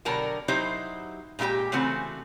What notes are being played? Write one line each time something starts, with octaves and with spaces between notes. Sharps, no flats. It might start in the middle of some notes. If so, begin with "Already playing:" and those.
B2 D3 F#3 A#4 G5 A5
F#3 D#4 E4 G4 C5
A#2 G#3 E4 G4 G5
C#3 E3 A3 C4 F#4